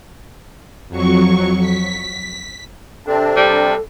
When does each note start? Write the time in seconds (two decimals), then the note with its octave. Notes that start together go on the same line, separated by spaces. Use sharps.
0.88 F2 F#3 C#6
1.61 B6
3.07 C3 C4 D4 A4
3.36 G3